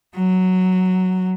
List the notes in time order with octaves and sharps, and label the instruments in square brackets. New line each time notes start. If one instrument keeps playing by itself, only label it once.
[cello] F#3